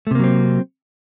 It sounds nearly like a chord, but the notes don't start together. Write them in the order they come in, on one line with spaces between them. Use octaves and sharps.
A3 C3 A#3 F#3 C4